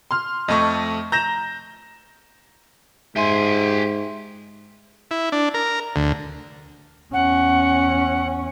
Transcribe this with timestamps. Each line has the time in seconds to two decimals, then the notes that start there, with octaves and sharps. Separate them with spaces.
0.11 C6 F6
0.48 F2 A3 D#5 C#6
1.12 A#5 G6 A#6 E7
3.16 G#2 G4 E5 G#5 C6
5.11 E4
5.32 D4
5.54 A#4
5.96 D2
7.13 E2 C#4 F#5